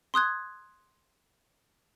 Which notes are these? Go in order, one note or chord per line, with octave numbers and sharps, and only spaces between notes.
C6 D#6 F#6 G#6